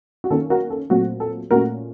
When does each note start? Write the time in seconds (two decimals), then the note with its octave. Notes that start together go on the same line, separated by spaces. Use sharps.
0.24 F#4
0.30 D#3 A#3 C#4 A4
0.50 F#4 A#4
0.70 A4
0.90 A#2 F#3 A3 C4 F#4
1.20 A4
1.51 A#2 A3 C#4 F#4 A#4